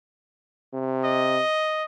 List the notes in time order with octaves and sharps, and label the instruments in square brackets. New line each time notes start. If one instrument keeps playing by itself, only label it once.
[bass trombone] C3
[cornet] D#5